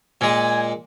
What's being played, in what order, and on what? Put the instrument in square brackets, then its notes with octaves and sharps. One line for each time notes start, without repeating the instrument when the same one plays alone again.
[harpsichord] A#2 G#3 [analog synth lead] G#5